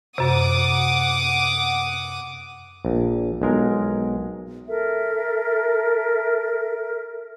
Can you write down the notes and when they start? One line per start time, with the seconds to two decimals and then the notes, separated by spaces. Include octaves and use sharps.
0.18 F#2 C3 F#5 D6 D#6
2.85 A#1
3.42 B1 G#3 A#4
4.68 A4 A#4 E5